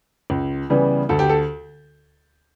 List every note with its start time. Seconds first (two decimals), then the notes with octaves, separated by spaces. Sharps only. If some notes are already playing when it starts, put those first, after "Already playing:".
0.30 C#2
0.70 C#3 E3 G3 B3
1.09 D2 A4
1.19 G4
1.29 A4